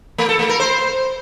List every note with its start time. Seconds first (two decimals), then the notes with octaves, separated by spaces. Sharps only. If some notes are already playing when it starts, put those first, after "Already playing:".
0.18 A3
0.29 A4
0.39 A3
0.49 A#4
0.60 C5